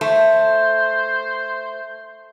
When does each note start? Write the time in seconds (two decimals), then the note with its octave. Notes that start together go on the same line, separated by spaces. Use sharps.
0.01 A3 C5